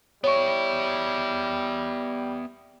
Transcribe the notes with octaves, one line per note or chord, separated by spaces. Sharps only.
G3 B3 C#5 E5 C#6